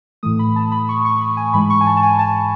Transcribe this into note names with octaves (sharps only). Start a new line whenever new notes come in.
A2 E3 A3 D#6
B5
A5
B5
C#6
C#6
B5
G#5
G#2 E3 G#3 B5
C#6
G#5
A5
A5
G#5
A5